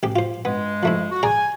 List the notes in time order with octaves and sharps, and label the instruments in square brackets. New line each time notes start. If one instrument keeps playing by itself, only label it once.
[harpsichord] A1 G4
F4 C5
[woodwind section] G2 G#3 [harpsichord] B3
[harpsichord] F3 A3 E4
[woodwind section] F#4
[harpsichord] G#4 D5 A#5 [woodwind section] G#5